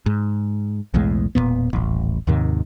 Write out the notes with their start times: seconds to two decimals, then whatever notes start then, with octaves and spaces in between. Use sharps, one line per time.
0.06 G#2
0.94 B1 E2 A2 G#3
1.35 E1 F#2 A#2 B3
1.73 D#1 A1
2.27 D#2 G#2 C3 D#3